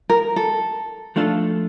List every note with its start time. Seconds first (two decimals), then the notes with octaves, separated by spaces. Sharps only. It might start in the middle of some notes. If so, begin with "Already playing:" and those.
0.10 A#4
0.36 A4
1.16 F3 A3 D4 F4 A4